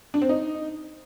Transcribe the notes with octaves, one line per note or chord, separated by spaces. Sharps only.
D4
C4
D#4